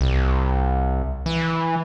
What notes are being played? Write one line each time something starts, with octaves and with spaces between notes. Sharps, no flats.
C2
E3